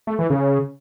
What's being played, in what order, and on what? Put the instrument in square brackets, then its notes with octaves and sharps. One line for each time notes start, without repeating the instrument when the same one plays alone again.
[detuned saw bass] A3
E3
C#3